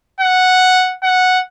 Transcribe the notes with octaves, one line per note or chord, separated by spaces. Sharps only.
F#5
F#5